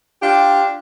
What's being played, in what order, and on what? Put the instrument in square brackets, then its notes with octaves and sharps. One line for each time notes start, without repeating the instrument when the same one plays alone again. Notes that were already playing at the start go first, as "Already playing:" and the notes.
[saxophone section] D4 F4 G4